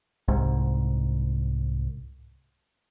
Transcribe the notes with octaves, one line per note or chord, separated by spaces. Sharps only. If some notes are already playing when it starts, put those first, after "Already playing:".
C2 G#2